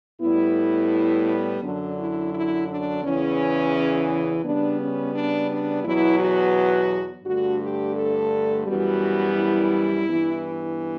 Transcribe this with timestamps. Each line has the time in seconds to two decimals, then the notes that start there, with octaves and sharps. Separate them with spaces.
0.21 A2 G3 B3 E4
1.62 F#2 D3 F#3 D4
1.97 E4
2.33 E4
2.68 D4
3.02 E2 C#3 E3 C#4
4.43 C#3 G3 B3 D4
4.78 C#4
5.14 D4
5.49 D4
5.84 E2 B2 F#3 B3 E4
6.19 F#4
7.25 G2 D3 A3 F#4
7.60 G4
7.95 A4
8.66 F#2 E3 G3 B3 F#4
9.36 E4
10.06 G2 E3 B3